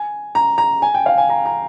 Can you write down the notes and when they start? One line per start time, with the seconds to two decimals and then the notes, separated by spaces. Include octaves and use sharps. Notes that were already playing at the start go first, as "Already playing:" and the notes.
Already playing: G#5
0.35 A#5
0.58 A#5
0.82 G#5
0.94 G5
1.06 F5
1.18 G#5
1.30 A#5
1.46 A#5